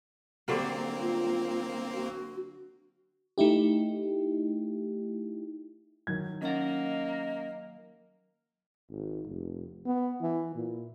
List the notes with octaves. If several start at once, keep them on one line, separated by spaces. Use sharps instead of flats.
D3 F#3 G3 A#3 C4
F4
F#4
A3 D#4 E4 G4
D#3 F#3 G#6
A#3 C#4 D#5 F#5
G#1
F1
B3
E3
A#2